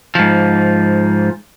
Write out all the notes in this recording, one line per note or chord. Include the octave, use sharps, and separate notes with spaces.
G#2 F3